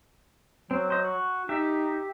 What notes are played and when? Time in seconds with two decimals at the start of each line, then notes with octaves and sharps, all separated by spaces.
0.71 F#3 C4
0.90 C5 D#5
1.04 F#4
1.49 D#4 G4 E5